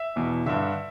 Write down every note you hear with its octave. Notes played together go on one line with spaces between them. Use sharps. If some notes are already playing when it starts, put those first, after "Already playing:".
Already playing: E5
E2 B2
G2 D3 E5